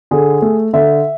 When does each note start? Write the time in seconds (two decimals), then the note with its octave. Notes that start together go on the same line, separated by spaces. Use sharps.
0.11 D3 G#4
0.42 A3
0.73 D3 E5